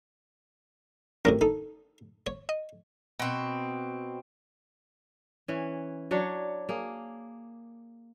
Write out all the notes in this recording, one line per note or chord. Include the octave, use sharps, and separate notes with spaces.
F#2 A2 C3 A#4
D#4 A4
C#5
D#5
B2 C4
E3 C#4
F#3 D4 C#5
A#3 G#4